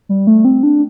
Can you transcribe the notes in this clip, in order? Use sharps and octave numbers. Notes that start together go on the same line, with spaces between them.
G3
A3
C4
D4